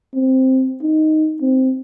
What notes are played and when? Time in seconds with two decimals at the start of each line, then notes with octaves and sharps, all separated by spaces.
0.14 C4
0.82 D#4
1.41 C4